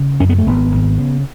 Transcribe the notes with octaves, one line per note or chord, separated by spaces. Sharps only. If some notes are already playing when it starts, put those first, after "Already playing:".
Already playing: C#3
F#2 C#4
B3
A3
G#1 B3
G#1
C#3